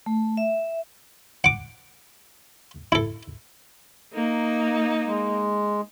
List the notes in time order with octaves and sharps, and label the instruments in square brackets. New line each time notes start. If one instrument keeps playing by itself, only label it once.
[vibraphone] A3
E5
[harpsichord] F#5 D6
E4 A4
[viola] A#3 D#4
[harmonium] G#3